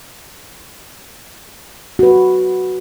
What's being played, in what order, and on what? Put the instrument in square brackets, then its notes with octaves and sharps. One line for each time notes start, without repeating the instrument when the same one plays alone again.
[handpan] F#4 B4